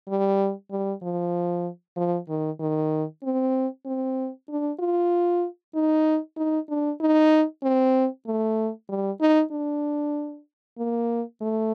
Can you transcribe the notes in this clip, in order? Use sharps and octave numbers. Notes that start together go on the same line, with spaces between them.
G3
G3
F3
F3
D#3
D#3
C4
C4
D4
F4
D#4
D#4
D4
D#4
C4
A3
G3
D#4
D4
A#3
A3